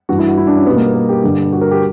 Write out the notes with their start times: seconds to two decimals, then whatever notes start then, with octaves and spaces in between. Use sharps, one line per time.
0.09 G2 E3 G3 F#4
0.18 E4
0.28 F#4
0.37 E4
0.47 D4
0.57 C#4
0.66 B2 G3 B3
0.76 A#3
0.85 B3
0.95 A#4
1.09 G4
1.24 G2 D3 G3 G4
1.53 F#4
1.61 A#4
1.71 G4